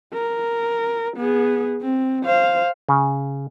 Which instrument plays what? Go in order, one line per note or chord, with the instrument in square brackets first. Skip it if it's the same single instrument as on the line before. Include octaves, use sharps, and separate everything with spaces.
[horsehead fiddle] A#4
B3 G#4
C4
C5 F5
[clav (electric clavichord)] C#3